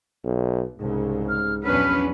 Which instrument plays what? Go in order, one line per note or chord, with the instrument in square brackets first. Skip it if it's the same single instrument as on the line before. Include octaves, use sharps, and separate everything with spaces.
[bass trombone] B1
[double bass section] C2 C#3 [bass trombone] G#2
[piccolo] F6
[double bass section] A#1 E2 F#3 [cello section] C#4 D4 B4 [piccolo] F6